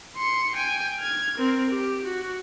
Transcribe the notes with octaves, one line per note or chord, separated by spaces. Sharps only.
C6 C#7
G5 G#5
F6 G#6
C4 A#4
G4
F#4